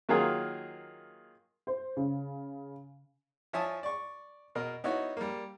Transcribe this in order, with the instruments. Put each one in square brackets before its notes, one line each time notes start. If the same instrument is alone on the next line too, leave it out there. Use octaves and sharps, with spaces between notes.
[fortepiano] D#3 F#3 A#3 F4 G#4
[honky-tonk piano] C5
C#3
[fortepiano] F3 C#5 E5 G#5 A5 D#6
D5 C#6
B2 A#4 D#5
B3 D#4 E4 F#4 C#5
G3 A#3